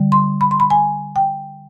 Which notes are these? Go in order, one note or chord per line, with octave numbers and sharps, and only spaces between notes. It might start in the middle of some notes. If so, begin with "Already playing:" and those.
Already playing: D3 G3
C6
B5
C6
B5
G#5
G5